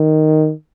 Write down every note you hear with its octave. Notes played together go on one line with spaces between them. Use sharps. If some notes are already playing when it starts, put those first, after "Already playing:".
Already playing: D#3